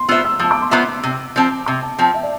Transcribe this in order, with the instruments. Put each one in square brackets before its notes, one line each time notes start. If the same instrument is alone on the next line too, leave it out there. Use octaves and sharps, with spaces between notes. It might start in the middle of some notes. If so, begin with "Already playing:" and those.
Already playing: [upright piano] C6
[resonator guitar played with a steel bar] B3 F4 C5 E5 [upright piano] E6
[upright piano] E6
[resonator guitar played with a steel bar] F3 [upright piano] E6
[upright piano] D6
C6
[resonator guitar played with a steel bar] B3 F4 C5 E5 [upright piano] D6
[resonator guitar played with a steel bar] C3
F3 C4
[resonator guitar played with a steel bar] C3 [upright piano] D6
[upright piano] A5
[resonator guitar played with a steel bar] F3 C4 [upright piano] G5
[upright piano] E5
D5